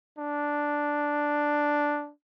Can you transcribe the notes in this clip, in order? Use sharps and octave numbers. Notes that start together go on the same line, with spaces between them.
D4